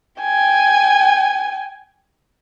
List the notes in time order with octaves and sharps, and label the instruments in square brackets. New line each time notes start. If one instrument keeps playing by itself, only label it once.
[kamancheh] G5 G#5